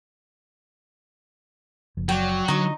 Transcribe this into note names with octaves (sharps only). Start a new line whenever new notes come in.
F#1 F3
F#3 D5 G5
D3 D#4 C#6